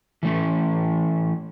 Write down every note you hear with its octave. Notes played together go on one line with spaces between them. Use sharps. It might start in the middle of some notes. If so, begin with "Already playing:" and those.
E3 A3 C#4